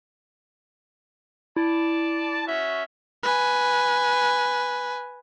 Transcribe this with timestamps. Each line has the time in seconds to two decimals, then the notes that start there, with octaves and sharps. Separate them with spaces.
1.56 E4 D5 A5
2.46 C#4 F#4 E5
3.23 B4 G#5